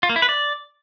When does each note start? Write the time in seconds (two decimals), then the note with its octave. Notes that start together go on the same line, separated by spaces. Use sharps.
0.03 F4
0.09 A#3
0.16 E4
0.22 B4
0.29 D5